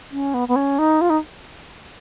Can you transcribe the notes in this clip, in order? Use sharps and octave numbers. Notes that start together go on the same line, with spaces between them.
C#4
B3
B3
C#4
D#4
F4
D#4